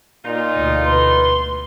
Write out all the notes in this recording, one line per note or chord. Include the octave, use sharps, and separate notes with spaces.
A#2 D#4 F4
D2 B2
B4 C6